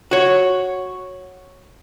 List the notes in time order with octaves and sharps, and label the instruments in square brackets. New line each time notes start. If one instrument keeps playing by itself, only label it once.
[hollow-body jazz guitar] F#4 C#5